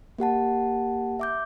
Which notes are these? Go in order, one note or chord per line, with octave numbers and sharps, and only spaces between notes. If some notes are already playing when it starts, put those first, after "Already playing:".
A#3 G4 F#5 A5
E5 D6 G6